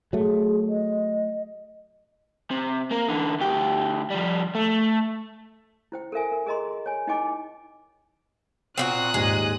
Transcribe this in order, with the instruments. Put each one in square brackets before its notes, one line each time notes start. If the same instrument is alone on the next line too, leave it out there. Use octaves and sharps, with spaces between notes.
[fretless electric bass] F#3 A3 [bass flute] G#4
[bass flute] D#5
[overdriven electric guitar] C3
A#3 A#4
D3 E3
D2 G4
F3 G3
A3
[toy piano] E4 C5 G5
A4 A#4 E5 G#5
A#4
G#4 A#4 D#5 A#5 C6
C#5 G#5
D#4 E4 D#5 G5 G#5 D6
[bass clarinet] A#2 [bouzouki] C4 E4 F#4 [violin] D#6 F#6
[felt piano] D#2 G#2 [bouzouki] G#3